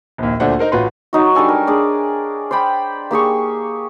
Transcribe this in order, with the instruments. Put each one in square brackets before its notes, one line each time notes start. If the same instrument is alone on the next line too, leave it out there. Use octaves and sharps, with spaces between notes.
[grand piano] A#1 D#2
D2 A#2 A3 D4 C5 F#5
D#4 A#4 C5
A1 F4 F#4 B4 C6
[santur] F#3 D#4 F#4
G3 D4 A4 G#5
A#4
D4 G#4 D5
C5 D5 G5 B5
A#3 G4 G#4 C#6